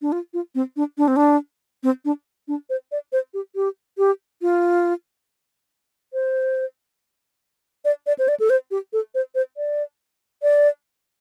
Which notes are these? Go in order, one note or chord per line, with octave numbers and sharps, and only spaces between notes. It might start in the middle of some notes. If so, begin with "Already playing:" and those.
D4
F4
F4
C4
D4
D4
C4
D4
C4
D4
D4
C5
D5
C5
G4
G4
G4
F4
C5
D5
D5
C5
D5
A4
C5
G4
A4
C5
C5
D5
D5